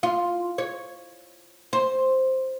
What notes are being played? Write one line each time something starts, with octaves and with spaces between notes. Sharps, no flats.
F4
C#5
C5